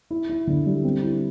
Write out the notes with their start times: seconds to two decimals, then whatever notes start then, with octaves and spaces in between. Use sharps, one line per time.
0.11 E4
0.29 E4
0.47 D3
0.66 G3
0.84 C4
1.03 E4